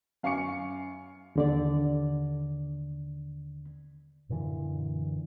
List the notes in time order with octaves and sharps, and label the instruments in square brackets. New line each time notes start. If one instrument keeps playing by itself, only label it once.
[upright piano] F#2 F5 G#5 C#6 D6 C#7
[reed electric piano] D#2 D3 D5
[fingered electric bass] F#2 A#2 D3 E3